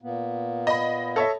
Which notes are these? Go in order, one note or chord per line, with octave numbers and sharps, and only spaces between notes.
A#2 A#3 B3
D#5 B5
A4 C#5 E5